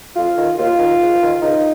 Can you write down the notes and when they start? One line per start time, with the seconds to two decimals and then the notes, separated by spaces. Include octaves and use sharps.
0.15 F2 F4
0.36 D#3
0.58 D#2 F4
0.79 D#3
1.00 G#2
1.21 D#3
1.41 C#2 D#4